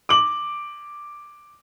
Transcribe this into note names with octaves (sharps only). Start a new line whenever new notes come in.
D6 F#7